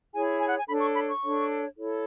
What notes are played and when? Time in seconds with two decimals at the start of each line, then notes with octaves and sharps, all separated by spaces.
0.14 E4 G#4 C#5 G#5
0.41 G#5
0.49 F#5
0.58 G#5
0.67 D4 A4 C#5 B5
0.81 C#6
0.95 B5
1.08 C#6
1.22 D4 A4 C#5
1.77 E4 A4 C#5